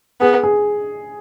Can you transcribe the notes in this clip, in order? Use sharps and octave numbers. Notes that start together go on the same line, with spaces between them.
B3 G#4
G#4